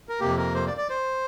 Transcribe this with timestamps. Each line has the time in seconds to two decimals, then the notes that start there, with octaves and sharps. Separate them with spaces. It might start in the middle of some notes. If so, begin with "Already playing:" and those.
0.09 A#4
0.20 F2 C3 A#3 G4
0.38 A#4
0.55 C5
0.67 D5
0.77 D5
0.90 C5